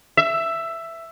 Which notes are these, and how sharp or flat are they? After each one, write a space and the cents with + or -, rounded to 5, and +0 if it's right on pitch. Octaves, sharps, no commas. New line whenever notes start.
E5 +10